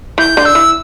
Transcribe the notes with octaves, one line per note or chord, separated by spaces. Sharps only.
E3 G6
D3
E6
E3